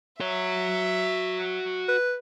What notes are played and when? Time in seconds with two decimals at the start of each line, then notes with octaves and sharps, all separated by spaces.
0.20 F#4 C#5 E5
1.88 B4